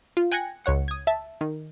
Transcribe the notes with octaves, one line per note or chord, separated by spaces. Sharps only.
F4
G5 G#5 F#6 G#6 A#6 C#7
C#2 C#5 F#5 C#7
D#6 G#6
E5 A5
D#3